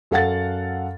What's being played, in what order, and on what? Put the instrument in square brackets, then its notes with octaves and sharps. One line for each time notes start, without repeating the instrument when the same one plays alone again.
[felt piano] F#2 A4 F5 F#5 A6